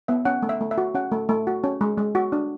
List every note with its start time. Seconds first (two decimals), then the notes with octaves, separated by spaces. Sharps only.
0.08 B3 E5
0.25 C#4 F#5
0.42 A3
0.49 E5
0.61 A3
0.71 E5
0.78 F#4
0.95 C#4 F#5
1.12 A3
1.29 A3
1.47 F#4
1.64 C#4
1.81 G#3
1.98 G#3
2.15 F#4
2.32 D4